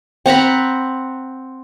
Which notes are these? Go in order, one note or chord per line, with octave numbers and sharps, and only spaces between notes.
C4 F#5 A#5 B5